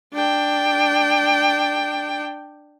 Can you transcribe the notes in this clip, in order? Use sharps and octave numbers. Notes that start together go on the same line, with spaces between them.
D4 G5